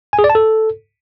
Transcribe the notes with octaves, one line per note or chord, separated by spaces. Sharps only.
G#5
G#4
D5
A5
A4